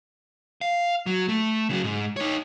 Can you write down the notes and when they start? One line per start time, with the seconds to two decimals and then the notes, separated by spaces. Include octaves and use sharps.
0.61 F5
1.06 F#3
1.29 A3
1.69 C#3 F#3
1.84 G#2
2.17 D#4 C#5